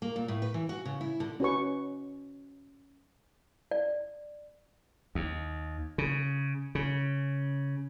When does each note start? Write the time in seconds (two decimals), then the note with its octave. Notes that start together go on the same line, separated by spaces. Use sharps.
0.02 A#3
0.16 A#2
0.28 A2
0.42 B4
0.54 E3
0.69 F#4
0.85 C#3
1.01 E4
1.20 D3
1.40 C#4 F#4 B4 C#6
3.71 D5
5.15 D#2
5.98 C#3
6.75 C#3